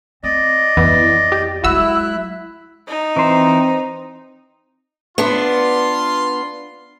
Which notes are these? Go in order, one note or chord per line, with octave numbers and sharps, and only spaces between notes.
C4 D5 D#5
F2 E3 B3
G4
F#3 G#3 E4 F#4 B5 E6 F#6
D#4
E3 C4 C5 A#5
B3 D4 F4 C6